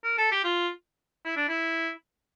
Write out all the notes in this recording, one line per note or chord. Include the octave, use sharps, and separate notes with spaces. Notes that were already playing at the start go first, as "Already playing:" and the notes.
A#4
A4
G4
F4
E4
D4
E4